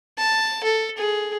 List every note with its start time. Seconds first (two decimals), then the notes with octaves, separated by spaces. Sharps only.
0.18 A5
0.64 A4
0.98 G#4